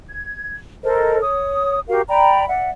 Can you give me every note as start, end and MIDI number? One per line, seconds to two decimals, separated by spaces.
0.09 0.56 92
0.83 1.20 69
0.83 1.20 70
0.83 1.20 72
0.83 1.20 75
1.21 1.79 73
1.21 1.79 87
1.88 2.01 66
1.88 2.01 67
1.88 2.01 70
1.88 2.01 77
2.08 2.44 74
2.08 2.44 79
2.08 2.44 82
2.08 2.44 83
2.48 2.70 74
2.48 2.70 76
2.48 2.70 78